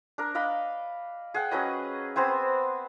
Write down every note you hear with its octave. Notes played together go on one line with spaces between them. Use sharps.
D4 A#4
D5 D#5 F5 B5
G#4 F#5 G5
F#3 C#4 B4 D#5
B3 C4 C5 G#5